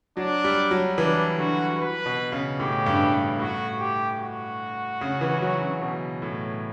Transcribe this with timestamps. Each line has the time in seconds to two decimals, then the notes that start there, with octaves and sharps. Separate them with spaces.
0.17 F#3 D4
0.44 G3
0.71 F#3
0.97 E3 D4
1.38 D3 F#4
1.79 B4
2.06 B2
2.32 C#3
2.60 A2 G4
2.86 G2
3.13 G2
3.39 A2 F#4
3.80 G4
4.20 F#4
5.01 C#3
5.21 E3
5.42 F#3
5.62 C#3
5.82 B2
6.22 A2